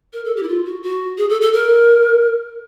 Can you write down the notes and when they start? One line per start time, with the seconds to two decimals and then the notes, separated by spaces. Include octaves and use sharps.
0.13 A#4
0.25 A4
0.36 G4
0.43 E4
0.48 F4
0.65 F#4
0.83 F#4
1.18 G#4
1.29 A4
1.41 A4
1.53 A#4